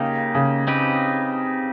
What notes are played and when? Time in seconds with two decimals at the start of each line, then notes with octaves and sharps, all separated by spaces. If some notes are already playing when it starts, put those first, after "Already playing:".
Already playing: C#3 A#3 D#4 G4
0.34 C#3
0.67 C4 D#4 G4 B4